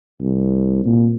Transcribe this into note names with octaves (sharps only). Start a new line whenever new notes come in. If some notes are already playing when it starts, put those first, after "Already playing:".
C2
A#2